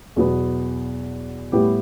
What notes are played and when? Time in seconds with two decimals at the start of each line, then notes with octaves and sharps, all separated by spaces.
0.16 E2 B2 F#3 B3
1.52 A2 G3 B3 E4 G4